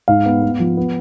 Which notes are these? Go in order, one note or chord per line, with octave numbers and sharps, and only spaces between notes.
G#2 F5
B3
B3
F3
B3